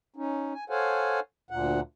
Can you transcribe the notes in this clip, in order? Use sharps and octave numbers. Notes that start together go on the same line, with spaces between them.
C#4 D#4
G#5
A4 C5 C#5 F5 F#5 G#5
D2 A#2 F#5